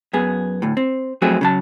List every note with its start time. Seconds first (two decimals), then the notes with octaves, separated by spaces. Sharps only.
0.13 F#2 B3 G#4
0.62 D2 A2
0.77 C4
1.22 F2 F#3 A3 C4 F#4 G#4
1.41 C#3 F#3 A5